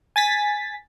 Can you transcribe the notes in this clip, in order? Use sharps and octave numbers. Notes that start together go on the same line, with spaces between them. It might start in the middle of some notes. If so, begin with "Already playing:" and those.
G#5 A6 B6